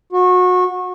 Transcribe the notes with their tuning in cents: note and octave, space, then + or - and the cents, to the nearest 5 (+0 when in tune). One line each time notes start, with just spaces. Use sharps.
F#4 -25